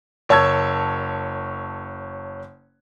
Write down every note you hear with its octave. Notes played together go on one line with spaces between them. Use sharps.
F#1 C#5 A5 E6 G#6